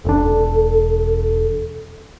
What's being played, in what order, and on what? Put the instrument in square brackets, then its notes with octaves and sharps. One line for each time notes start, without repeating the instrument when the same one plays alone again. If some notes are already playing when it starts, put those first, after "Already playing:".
[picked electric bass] E1 D4 [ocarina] A4